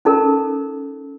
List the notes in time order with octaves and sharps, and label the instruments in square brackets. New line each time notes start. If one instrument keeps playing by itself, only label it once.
[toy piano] C#4 D#4 A4 A#4